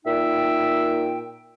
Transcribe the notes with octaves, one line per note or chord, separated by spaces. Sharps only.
A#2 D#4 E5 G5